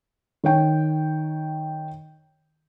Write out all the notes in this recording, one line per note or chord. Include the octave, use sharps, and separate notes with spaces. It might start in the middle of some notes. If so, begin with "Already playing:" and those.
D#3 C#5 G5